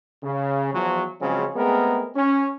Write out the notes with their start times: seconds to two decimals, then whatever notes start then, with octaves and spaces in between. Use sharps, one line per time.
0.23 C#3
0.74 E2 F3 F#3
1.21 C#3 F3 F#3 G#3 C4 C#4
1.56 G#3 A3 B3 C4 G#4 A#4
2.16 C#4